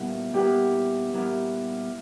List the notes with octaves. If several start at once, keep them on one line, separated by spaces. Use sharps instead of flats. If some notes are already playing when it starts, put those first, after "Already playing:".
Already playing: A#2 G3 B3 E4 A#4
A#2 G3 B3 E4 G4 A#4
A#2 G3 B3 E4 A#4